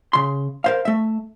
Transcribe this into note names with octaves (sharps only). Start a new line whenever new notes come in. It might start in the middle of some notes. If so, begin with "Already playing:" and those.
C#3 C6
A#4 C5 F5
A3 E5